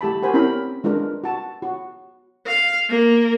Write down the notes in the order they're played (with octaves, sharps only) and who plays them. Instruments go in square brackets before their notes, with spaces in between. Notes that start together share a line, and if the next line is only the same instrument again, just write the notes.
[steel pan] A3 G4 A5 B5
F#4 G4 A#4 C5 G#5 B5
C4 C#4 E4 A#4 B5
G#3 D4 F4 A#4 B4
F#4 A5
F#4
[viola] F5
A#3